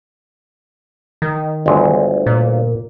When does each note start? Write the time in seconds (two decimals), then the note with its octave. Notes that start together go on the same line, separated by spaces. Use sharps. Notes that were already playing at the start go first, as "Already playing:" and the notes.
1.22 D#3
1.66 G1 D2 G#3
2.26 A#2